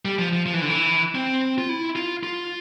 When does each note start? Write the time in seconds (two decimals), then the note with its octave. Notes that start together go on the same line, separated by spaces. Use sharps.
0.05 G3
0.18 F3
0.33 F3
0.46 F3
0.53 E3
0.62 D3
0.69 E3
1.15 C4
1.58 F4
1.69 E4
1.96 F4
2.23 F4